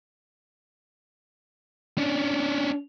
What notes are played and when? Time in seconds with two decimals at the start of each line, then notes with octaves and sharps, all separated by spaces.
1.98 C#4 D4